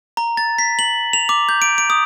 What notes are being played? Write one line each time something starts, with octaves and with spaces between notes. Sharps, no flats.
A#5
A6
B6
F#7
F7
D6
G6
D7
D7
D#6